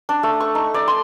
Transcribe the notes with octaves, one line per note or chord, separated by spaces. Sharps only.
D4
A3
C#6
D#4
D5
C6